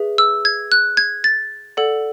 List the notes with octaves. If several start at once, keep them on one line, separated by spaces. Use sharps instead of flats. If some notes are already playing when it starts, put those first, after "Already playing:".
Already playing: G#4 B4 E5
E6
G#6
F#6
G#6
A6
A4 D5 F#5